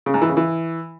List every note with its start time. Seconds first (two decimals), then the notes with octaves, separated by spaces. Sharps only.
0.06 C#3
0.14 G#2
0.22 E3
0.29 C#3
0.37 E3